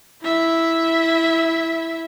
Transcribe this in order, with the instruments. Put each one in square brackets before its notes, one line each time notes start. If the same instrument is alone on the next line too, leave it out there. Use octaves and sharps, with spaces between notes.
[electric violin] E4 E5